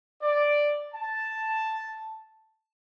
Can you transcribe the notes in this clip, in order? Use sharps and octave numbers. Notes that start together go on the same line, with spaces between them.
D5
A5